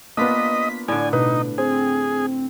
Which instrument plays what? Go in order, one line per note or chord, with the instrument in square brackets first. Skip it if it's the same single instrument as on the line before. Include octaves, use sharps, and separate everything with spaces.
[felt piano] A#3 B3 [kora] D4 F4 B4 [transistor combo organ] D#5 [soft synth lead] B6
[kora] A2 D3 [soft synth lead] D5 [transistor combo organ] G#5
[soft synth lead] B2 [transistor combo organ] D#4 [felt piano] B4
[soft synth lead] C4 [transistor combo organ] G#4 [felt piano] C5